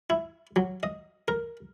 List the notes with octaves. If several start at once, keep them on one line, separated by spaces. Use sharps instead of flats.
E4
F#3
D#5
A#4